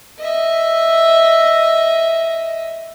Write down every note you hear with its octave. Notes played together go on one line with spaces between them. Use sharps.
D#5 E5